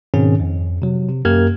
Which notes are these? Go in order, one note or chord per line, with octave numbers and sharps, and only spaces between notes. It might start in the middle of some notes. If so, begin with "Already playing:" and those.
G#2 B2 D#3 C4 C#4 G#4
F2
C3 F#3
C3
F#2 A#3 G4 A#4 F6 G#6